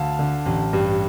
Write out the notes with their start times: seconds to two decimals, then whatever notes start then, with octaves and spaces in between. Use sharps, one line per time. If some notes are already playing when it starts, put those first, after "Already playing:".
Already playing: D2 F5 A5
0.19 D3
0.46 A1
0.73 G2